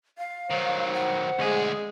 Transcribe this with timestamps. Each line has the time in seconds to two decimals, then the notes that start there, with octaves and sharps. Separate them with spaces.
0.18 F5
0.50 D#3 F#3 C5
0.94 F#5
1.39 D2 G#3 G#4